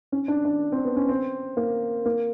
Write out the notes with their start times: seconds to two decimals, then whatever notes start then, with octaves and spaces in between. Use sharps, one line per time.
0.12 C#4
0.28 D4
0.45 D4
0.72 C4
0.85 B3
0.97 C#4
1.09 C4
1.57 A#3
2.05 A#3